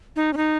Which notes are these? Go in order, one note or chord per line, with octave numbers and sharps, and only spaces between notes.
D#4
C#4
D#4